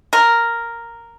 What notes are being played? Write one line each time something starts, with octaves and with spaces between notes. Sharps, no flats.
A#4